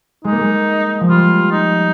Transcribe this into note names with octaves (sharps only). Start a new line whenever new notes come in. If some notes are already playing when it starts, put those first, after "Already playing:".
G#3 D#4
A#3
G#3
F3
G3 F4
D#4